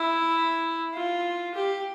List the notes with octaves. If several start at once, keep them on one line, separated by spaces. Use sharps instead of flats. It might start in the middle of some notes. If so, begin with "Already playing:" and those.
Already playing: E4
F4
G4